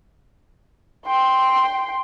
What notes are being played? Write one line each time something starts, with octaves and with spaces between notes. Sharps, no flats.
G5 C6